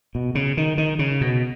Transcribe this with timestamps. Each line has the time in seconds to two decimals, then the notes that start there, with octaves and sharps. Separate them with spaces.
0.15 B2
0.35 C#3
0.57 D#3
0.78 D#3
0.99 C#3
1.21 B2